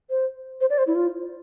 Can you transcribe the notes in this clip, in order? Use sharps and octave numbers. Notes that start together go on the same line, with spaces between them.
C5
C5
D5
C5
E4
F4